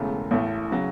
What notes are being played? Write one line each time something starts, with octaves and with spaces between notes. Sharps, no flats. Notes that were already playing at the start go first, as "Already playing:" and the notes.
Already playing: E1 E2 C#3 A3
A1 A2 A3
C#3 F#3